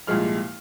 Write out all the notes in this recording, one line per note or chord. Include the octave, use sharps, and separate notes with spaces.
C2 A#2 F3 G#3 F6